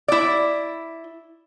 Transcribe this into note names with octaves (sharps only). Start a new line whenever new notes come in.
E4 D5